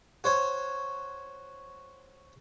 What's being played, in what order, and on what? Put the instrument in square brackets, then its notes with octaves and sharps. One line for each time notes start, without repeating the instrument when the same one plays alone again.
[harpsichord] F#4 C5 C#5